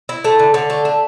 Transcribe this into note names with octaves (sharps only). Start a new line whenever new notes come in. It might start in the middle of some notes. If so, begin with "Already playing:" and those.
E4
A3
D3
D3
A3
A3